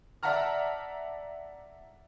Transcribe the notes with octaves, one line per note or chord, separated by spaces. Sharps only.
D5 E5 F#5 A5 A#5 F6